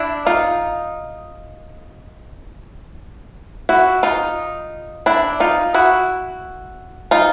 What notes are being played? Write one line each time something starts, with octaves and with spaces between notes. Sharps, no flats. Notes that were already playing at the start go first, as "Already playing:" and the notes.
Already playing: D4 E4
D#4 F4
E4 F#4
D#4 F4
D4 E4
D#4 F4
E4 F#4
D#4 F4